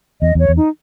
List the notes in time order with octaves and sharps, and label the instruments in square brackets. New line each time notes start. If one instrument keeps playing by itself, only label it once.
[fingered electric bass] E2 [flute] D#5
[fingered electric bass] E2 [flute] C#5
[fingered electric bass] E2
[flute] D#4